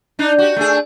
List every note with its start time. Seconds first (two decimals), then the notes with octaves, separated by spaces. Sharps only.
0.19 D4 D#4
0.38 F#4 G4
0.56 A3 D4 G#4